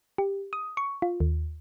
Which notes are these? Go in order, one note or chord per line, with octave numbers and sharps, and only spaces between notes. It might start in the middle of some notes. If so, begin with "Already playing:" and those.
G4
D#6
C#6
F4
D#2